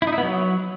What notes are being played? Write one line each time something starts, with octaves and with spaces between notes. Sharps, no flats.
E4
D#4
E4
B3
F#3